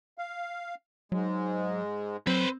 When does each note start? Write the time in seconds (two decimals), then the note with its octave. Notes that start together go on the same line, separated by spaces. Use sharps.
0.18 F5
1.12 G#2 F#3 G#3
2.27 F#3 C4 B4 C5